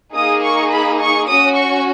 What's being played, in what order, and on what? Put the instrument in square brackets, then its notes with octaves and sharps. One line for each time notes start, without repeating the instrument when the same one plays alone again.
[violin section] A#3 D#4 G#4 D#6
C#6
B5
C#6
C#4 F#4 D#6
C#6